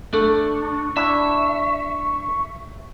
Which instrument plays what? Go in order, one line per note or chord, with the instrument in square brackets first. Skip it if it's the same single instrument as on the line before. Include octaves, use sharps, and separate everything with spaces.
[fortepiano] A3 [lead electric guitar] D4 [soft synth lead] C#6
[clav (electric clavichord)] D4 E4 [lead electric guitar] E5